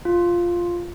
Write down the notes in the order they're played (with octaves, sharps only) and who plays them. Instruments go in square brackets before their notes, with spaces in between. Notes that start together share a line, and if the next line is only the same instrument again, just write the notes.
[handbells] F4